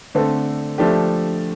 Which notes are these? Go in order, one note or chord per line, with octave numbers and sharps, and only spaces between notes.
D3 A3 C4 A4
F3 A3 D4 G4